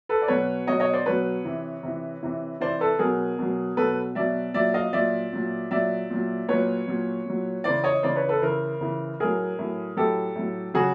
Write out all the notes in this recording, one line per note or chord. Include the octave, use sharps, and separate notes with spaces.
A4 B4
D5
B2 F#3 B4 C#5
B2 F#3 C#5 D#5
C#5 D#5
C5 D5
B2 F#3 B4 C#5
C3 E3
C3 E3
C3 E3
C3 E3 C5 D5
A4 B4
B2 F#3 G#4 A#4
B2 F#3
B2 F#3 A4 B4
B2 F#3 D5 E5
A#2 F#3 D5 E5
D#5 F5
A#2 F#3 D5 E5
A#2 F#3
A#2 F#3 D5 E5
A#2 F#3
A#2 F#3 B4 C#5
A#2 F#3
A#2 F#3
C#3 E3 C5 D5
C#5 D#5
C#3 E3 C5 D5
B4 C#5
A4 B4
C#3 E3 A#4 C5
C#3 E3
A2 F#3 G#4 A#4
A2 F#3
A2 F#3 G4 A4
A2 F#3
C#3 F#3 F#4 G#4